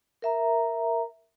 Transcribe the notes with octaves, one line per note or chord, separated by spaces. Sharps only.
A#4 E5 A#5